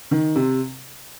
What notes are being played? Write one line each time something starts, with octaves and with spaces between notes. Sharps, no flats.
D#3
C3